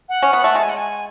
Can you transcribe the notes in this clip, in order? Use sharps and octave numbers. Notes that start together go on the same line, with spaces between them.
F#5
C#4
B3
A3
G#3 A5
G#5
F#5
G#5